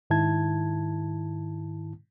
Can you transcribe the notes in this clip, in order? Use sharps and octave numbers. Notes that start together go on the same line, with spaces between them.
G#2 D#3 E4 A5 G#6